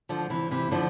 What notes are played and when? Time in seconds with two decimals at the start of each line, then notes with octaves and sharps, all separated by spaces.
0.09 D3 F3
0.30 C3 E3
0.51 C3 E3
0.71 D3 F3